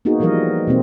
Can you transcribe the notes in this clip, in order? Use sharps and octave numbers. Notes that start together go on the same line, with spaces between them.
A#3 B3 D#4 F#4 G#4
E3 F3 G3 A#4 D#5
B2 A#3 C4